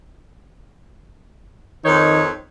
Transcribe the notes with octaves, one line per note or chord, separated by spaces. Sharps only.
F2 D#3 D#4 C#5